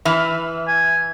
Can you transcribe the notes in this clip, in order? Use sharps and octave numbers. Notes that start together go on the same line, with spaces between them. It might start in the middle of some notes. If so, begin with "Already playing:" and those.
E3 E5 B5 F6
G#5